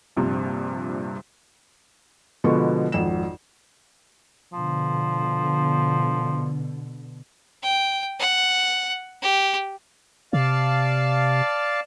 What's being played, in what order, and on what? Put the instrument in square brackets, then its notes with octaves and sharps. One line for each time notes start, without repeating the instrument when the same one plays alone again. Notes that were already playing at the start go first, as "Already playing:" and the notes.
[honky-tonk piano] A#1 G2 C3 F3
[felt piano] B2 D3 F3 G#3 B3 C#6
G#1 F2 E7
[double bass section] B2 D3 [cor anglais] F3
[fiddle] G5
F#5
G4
[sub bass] C3 [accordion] D5 F5 A5